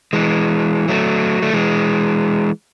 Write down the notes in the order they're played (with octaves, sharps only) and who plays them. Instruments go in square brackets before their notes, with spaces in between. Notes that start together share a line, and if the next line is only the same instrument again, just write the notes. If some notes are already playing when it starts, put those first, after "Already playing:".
[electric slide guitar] E3 G#3
F#3 A3
A3
E3 G#3